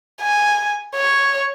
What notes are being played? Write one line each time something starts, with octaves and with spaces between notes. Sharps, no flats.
G#5
C#5